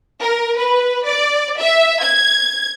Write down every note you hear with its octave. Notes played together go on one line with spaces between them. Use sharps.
A#4
B4
D5
E5
G#6